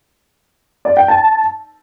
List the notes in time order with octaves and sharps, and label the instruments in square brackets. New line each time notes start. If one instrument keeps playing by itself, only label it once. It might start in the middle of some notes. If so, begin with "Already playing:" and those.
[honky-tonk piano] D5
G5
A5